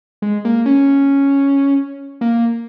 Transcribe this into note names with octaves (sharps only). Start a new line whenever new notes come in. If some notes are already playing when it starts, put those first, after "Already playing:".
G#3
A#3
C#4
A#3